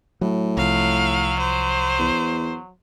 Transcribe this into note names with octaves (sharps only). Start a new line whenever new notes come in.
A2 F#3
C2 F3 F#3 F5
C5
E2